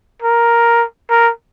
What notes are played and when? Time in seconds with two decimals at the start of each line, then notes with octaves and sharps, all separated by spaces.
0.22 A#4
1.10 A#4